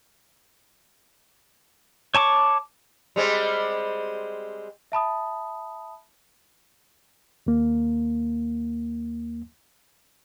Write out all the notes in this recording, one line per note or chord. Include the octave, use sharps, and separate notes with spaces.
C#5 A5 C#6 D6
G3 G#3 C4
E5 A5 B5 D#6
D#2 A#3